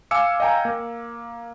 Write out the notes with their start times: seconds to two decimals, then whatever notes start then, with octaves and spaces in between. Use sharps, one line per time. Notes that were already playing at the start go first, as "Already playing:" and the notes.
0.11 F5 G#5 D6 E6 C#7
0.40 D#5 F5 G5 G#5 A#5
0.65 A#3